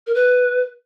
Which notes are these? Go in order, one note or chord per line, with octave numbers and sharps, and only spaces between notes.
A#4
B4